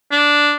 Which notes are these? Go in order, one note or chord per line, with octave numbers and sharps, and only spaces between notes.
D4